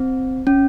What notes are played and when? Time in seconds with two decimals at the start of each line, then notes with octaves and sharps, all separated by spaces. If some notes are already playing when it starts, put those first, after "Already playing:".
Already playing: C4
0.47 C#4